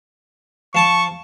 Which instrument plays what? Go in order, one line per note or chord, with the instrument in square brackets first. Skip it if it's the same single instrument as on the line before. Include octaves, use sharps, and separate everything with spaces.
[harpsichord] F3 A5 D6 [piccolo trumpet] C#6